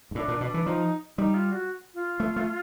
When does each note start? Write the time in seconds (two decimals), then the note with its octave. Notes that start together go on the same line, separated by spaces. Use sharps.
0.11 G#2
0.15 A2 D4
0.28 A#2
0.41 B2 D4
0.54 E3
0.66 F3 D#4
1.17 G3 D#4
1.34 F4
1.52 F#4
1.94 F4
2.20 A3
2.36 A3